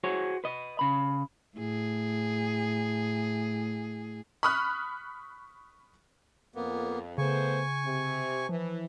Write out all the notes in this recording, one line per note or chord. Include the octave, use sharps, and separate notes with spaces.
F#4 G#4 C5 C#5
B4 D#5
C#3 B5
A2 G#4
B5 C#6 D#6 F6 F#6
F2 A#3 B3
C#3 A3 B3 C5 G#5 C#6
C3
E3 F3